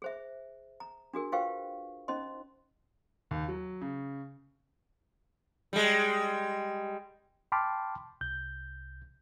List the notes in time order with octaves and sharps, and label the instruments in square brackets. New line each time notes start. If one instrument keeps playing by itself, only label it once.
[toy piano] G#4 C5 E5
A#5
D4 F#4 G#4 A#4
F4 B4 C5 F5 G5 C#6
C#4 D#4 C5 D#5 C6
[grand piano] D#2
F#3
C#3
[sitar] G3 G#3
[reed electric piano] G5 A5 B5 C6 D6 F6
C2 G6